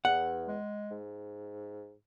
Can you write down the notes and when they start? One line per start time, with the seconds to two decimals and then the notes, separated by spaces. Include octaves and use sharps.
0.05 E2 F#5
0.48 G#3
0.90 G#2